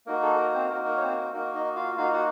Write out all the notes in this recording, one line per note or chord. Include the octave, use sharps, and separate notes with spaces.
A#3 D#4 F#4 A#4
A4
A#4
C4 C5
A#3 D#4 F#4 A#4
A#4
C#5
C4 C5
A#4
A#3 D#4 F#4 A#4
D#4 D#5
F4 F5
A#3 D#4 F4 F#4 F5
F#4 F#5